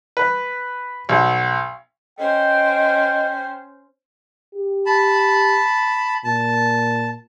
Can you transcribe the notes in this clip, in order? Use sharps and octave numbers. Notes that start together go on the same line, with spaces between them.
B4
B1
C#4 C5 D#5 G5
G4
A5 B5
A#2 A5